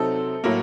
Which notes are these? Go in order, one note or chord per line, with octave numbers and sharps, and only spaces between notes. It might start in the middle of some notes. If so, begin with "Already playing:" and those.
Already playing: C3 F#3 C4 D#4 A4
A2 F#3 A#3